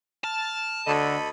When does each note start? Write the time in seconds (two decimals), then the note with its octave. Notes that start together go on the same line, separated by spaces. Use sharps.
0.24 A5 F6
0.87 D2 D3 A4 D#5 B5